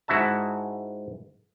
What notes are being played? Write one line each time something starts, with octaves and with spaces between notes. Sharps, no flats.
G#2 E4 F#4 E5 A5